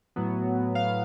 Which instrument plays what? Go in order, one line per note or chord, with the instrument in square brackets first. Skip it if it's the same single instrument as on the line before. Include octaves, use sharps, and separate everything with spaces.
[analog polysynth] A2 F#3 B3
F5